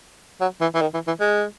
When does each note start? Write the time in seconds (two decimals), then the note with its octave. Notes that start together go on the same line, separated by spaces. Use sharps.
0.41 F#3
0.61 E3
0.74 E3
0.81 D#3
0.94 E3
1.07 E3
1.20 G#3